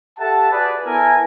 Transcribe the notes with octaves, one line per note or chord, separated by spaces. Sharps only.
G4 A4 E5 F#5 A5
F#4 G#4 B4 D5
B3 E4 A4 A#4 G#5